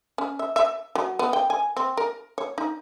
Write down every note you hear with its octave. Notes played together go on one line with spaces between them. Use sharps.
C#4
E5
E5
F#3
B3
G5
G#5
C4
A#4
C#5
D#4